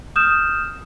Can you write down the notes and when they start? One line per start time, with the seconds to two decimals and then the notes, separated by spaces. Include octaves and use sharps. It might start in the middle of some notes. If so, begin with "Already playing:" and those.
0.16 D#6 F6 G6 E7